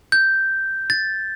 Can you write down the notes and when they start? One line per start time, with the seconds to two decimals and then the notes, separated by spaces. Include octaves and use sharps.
0.12 G6
0.90 A6